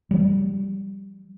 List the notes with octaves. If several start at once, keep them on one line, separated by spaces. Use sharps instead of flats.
F3 G3